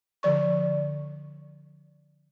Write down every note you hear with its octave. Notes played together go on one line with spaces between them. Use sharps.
D3 F3 D5 C#6